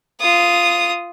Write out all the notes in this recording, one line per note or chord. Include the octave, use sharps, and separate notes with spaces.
F4 D#6